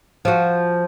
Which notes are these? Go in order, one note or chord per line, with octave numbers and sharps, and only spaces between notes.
F3 F#4